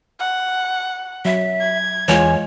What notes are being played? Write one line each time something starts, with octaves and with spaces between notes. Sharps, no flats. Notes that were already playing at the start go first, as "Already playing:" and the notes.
F#5
F#3 E5
G#6
E2 E3 G#3 F4 C#5 G#5